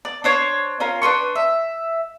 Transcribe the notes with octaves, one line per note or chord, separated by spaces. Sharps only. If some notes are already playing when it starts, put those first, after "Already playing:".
D5
D4 C5 C#5
C#4 F4 A#4
D4 B4 C6 C#6
E5